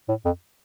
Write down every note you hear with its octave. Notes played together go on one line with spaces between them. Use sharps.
A2
F2